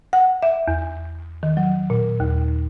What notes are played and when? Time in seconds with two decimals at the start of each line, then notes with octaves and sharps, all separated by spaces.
0.13 F#5
0.42 E5
0.68 E2
1.43 D#3
1.57 F#3
1.90 A#2
2.20 D#2